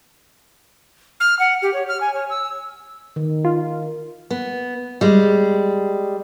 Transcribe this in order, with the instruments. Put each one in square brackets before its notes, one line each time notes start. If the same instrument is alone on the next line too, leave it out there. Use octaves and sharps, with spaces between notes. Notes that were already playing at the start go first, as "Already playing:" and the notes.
[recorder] F6
F#5
G4
C#5
F6
G#5
C#5
E6
[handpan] D#3
[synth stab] F4
[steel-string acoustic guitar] B3
G3 G#3